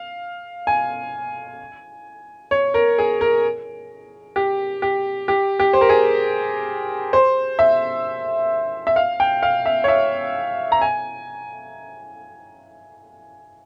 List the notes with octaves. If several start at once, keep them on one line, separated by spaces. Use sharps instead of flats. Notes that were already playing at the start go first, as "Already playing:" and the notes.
Already playing: F5
G#5
C#5
A#4
G#4
A#4
G4
G4
G4
G4
C5
A#4
G#4
C5
E5
E5
F5
G5
F5
E5
C#5
E5
A#5
G#5